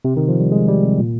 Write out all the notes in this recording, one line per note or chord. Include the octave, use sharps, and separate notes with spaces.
C3
D#3
F3
G3
G#3
G3
C3
A#2